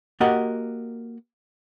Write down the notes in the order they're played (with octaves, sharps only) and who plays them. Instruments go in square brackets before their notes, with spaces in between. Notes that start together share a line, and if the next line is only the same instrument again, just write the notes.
[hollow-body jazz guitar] A#3 F#4 G4 A#4 D#5 F#5